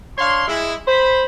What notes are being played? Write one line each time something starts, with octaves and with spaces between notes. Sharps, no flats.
D4 C#5 F5 C6
G#3 E4
C5 B5